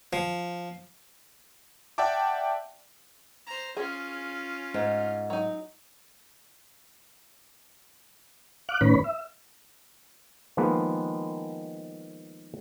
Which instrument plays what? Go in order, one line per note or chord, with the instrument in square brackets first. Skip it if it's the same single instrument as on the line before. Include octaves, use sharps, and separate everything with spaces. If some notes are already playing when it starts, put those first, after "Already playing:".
[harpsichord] F3
[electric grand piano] D5 E5 F#5 G5 A5 D6
[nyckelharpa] C5 A#5
[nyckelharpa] C#4 F4 [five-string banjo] G#4
[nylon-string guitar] G#2
[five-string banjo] F#3 D#4
[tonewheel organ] F5 D6 F#6
A2 D#3 C#4 B4 C#5 B5
E5
[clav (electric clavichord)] D#3 F3 G#3 A#3 B3 B4